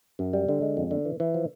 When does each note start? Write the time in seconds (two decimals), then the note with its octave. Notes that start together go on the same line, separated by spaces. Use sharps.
0.19 F#2
0.33 G3
0.49 D3
0.62 G#3
0.77 F2
0.91 D3
1.05 E3
1.20 E3
1.34 F3